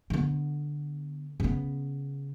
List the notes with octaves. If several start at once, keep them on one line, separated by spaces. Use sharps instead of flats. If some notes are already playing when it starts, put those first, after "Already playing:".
D3 B3
C#3 B3